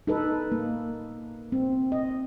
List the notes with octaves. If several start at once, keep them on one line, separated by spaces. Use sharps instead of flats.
D#4 A4 B4
A#3
C4
D#5